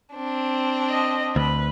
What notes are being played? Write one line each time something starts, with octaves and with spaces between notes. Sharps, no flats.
C4 D4
D#5
D2 B4